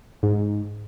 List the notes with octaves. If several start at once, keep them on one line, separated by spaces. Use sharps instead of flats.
G#2